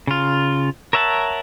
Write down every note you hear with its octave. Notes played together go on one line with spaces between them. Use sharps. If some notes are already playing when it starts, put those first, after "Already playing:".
C#3 F4
A#4 C#5 E5 F#5 A5